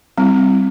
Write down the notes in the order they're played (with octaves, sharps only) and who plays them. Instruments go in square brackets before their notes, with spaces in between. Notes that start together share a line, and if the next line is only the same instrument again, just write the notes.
[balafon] G3 C4 E4